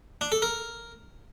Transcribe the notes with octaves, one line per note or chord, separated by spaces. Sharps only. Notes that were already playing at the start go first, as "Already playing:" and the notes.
D4
A4
A#4